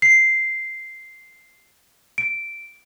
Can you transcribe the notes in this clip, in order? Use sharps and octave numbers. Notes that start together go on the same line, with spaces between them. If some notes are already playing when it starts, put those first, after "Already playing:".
C7
D7